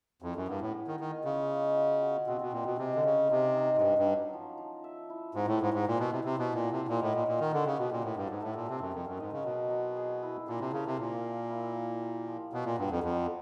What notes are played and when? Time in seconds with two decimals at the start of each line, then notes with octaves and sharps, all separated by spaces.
0.22 F2 E4
0.36 F#2
0.48 G2 B3
0.61 A2
0.73 G#4
0.87 D#3
0.99 D#3 D#5
1.25 C#3 F4
1.51 G#3
1.76 F#4
2.02 F#4
2.27 B2 C4
2.41 B2
2.53 A#2 C4
2.65 B2
2.78 C3 G#3
2.95 D3
3.04 C#3 C#4
3.30 C3 D#4
3.56 D#4
3.77 G#2
3.81 G2 C#4
3.98 G2
4.07 F#3
4.33 F3
4.58 F3
4.84 E5
5.10 E4
5.35 G#2 C4
5.48 A2
5.61 G#2 G#4
5.74 G#2
5.86 A#2 G#4
5.99 B2
6.12 C3 E4
6.24 C3
6.38 B2 D4
6.54 A#2
6.63 F#4
6.71 C3
6.88 A#2 D#4
7.02 A2
7.15 A#2 F#4
7.28 A#2
7.40 D#3 A#4
7.53 D3
7.65 C#3 G4
7.78 B2
7.92 A#2 F#4
8.04 A2
8.16 G2 A4
8.30 G#2
8.42 A2 A3
8.56 A#2
8.68 C3 C4
8.81 F#2
8.93 F2 A#4
9.07 F#2
9.20 G#2 D#5
9.32 C#3
9.45 B2 F#3
9.70 F#3
9.97 G#4
10.23 E4
10.48 A#2 D4
10.60 C3
10.73 C#3 A#4
10.86 C3
10.99 A#2 F5
11.24 F5
11.50 E4
11.76 A#3
12.01 G4
12.27 F3
12.52 B2 F#3
12.65 A#2
12.78 G2 B3
12.90 F2
13.03 F2 B4